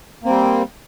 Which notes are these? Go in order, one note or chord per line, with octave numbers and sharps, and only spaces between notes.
G3 A#3 C4